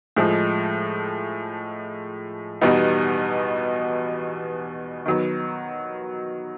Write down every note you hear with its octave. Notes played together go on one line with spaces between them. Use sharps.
A2 F3 G#3
E2 B2 G3 B3 D#4
D#3 F#3 B3